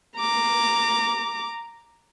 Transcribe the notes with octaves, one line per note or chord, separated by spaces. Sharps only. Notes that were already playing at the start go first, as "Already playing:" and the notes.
A#5 D6